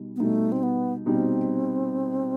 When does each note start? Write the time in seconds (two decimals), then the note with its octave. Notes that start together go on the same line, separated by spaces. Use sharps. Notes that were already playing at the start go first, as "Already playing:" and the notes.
Already playing: B2 G3 D#4
0.16 B3
0.20 B2 G3 A3 D#4
0.52 C4
0.63 B3
1.06 B2 G3 C4 D#4